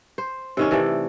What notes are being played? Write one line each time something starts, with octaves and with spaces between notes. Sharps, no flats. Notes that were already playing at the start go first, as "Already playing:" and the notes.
C5
C3 D#3 C#4
C3 E3 A3 D5